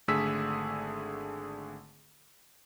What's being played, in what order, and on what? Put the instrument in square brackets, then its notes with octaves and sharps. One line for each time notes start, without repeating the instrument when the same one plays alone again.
[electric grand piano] G#1 D3 A3 G#4 E6 B6